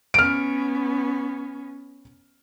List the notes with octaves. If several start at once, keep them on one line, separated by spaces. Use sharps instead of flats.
B3 C#4 F6 D7